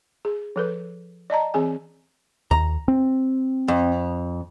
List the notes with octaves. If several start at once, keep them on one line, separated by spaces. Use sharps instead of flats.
G#4
F3 A4 B4
D5 D#5 A5 A#5
E3 C4 G#4 G#5
D#2 A#5
C4
F2